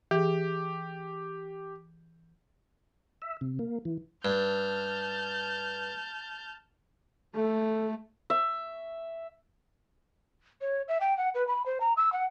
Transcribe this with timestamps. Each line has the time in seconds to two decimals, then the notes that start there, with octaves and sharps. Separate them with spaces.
0.11 E3 G4 G#4
3.22 E5
3.41 C3
3.59 A#3
3.85 E3
4.25 G2 A5 F6 G6
7.35 A3 A4
8.30 E5
10.61 C#5
10.88 E5
11.00 G5
11.17 F#5
11.34 B4
11.47 B5
11.65 C5
11.80 A#5
11.97 E6
12.12 F#5